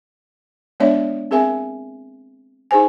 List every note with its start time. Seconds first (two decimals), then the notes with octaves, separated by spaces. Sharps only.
0.80 G#3 B3 D4 C#5 D5 E5
1.31 C4 G#4 A#4 E5 G#5
2.71 D#4 G#4 C5 G#5